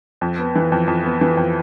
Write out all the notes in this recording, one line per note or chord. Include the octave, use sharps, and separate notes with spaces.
F2
B3
E3
F2
F2
B3
E3
F2